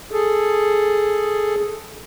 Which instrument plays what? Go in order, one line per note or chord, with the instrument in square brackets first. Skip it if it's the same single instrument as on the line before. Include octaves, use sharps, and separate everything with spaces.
[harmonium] G#4 A4